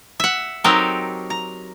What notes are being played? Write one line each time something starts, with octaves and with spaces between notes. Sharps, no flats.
E5 F#5
F#3 C4 D#4 G4 A4 A#4
A#5